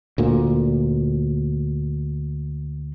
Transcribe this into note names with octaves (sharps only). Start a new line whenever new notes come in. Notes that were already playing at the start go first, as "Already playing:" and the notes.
D2 A#2 A#3